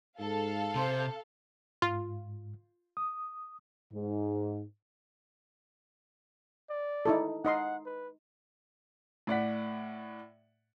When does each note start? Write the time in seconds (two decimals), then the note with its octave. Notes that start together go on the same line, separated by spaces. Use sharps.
0.20 G#2 A4 F5
0.76 C3 C5
1.82 G#2 F4
2.97 D#6
3.94 G#2
6.70 D5
7.06 D#4 E4 A4
7.45 D#4 D#5 F#5 C6
7.86 B4
9.27 A2 D5 F#5 B6